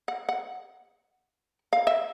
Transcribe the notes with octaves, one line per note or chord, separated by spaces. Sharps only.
F#5
F#5
F5
E5